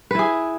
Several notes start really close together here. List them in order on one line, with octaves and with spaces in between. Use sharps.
B4 E4 G#4